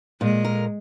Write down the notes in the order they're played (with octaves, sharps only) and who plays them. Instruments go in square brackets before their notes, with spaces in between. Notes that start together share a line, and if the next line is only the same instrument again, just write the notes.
[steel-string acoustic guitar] A#2 [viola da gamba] G#3
[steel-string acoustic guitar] A#4